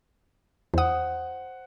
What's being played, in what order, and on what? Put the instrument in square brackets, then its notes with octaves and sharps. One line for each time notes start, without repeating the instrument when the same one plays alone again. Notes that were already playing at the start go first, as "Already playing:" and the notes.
[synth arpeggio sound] E2 D#6 [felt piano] C5 F#5